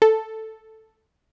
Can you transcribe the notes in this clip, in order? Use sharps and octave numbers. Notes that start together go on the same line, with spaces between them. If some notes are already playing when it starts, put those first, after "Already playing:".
A4